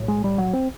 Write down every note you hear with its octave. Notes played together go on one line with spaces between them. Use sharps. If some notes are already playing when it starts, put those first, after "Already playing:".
Already playing: B1 A2
G#3
G3
F#3
C4